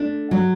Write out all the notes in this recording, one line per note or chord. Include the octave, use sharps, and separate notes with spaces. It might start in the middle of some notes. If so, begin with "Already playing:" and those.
Already playing: A3 D4
F#3